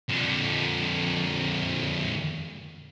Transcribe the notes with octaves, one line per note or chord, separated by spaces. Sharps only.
F2 D3